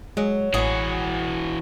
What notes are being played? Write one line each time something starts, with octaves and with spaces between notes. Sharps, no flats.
F#3 G#3
A1 E3 F#4 G#4 B4